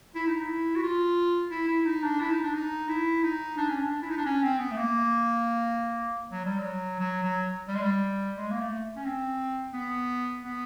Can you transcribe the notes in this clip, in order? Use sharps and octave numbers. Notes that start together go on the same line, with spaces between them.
E4
D#4
E4
F#4
F4
E4
E4
D#4
D4
E4
D#4
D4
D#4
E4
D#4
D4
C#4
D4
E4
D#4
D4
C#4
C4
B3
A3
A#3
F#3
G3
F#3
F#3
F#3
G3
G#3
G3
G#3
A#3
A3
C#4
C4
B3
B3